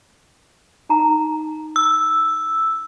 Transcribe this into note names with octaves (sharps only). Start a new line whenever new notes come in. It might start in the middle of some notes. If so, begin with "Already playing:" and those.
D#4 A#5
E6